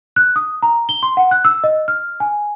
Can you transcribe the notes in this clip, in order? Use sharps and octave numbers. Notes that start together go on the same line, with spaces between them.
F#6
D#6
A#5
G7
C6
F#5
F#6
E6
D#5
F6
G#5